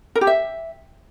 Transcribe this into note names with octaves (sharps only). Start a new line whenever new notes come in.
A#4
G4
E5